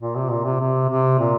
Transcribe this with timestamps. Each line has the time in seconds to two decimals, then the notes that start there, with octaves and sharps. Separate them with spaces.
0.01 A#2
0.16 C3
0.31 A#2
0.45 C3
0.60 C3
0.90 C3
1.19 A#2